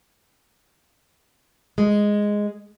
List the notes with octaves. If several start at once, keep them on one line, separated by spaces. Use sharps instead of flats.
G#3